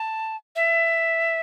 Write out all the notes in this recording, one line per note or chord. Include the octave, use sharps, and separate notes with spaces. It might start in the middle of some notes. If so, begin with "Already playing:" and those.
Already playing: A5
E5